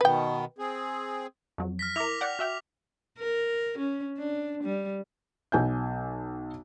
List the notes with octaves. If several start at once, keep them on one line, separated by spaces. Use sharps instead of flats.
B2 D#3 B3 B4 G5
C4 G#4
F2 F#3
F6 A#6 B6
E4 A#4 D6 A#6 F7
D5 F#5 G5
F#4 E5 G5
A#4
C#4
D4
G3
B1 G#5 G6